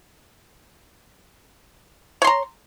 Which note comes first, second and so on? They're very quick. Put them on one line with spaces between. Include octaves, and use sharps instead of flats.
C#5 C6 A#5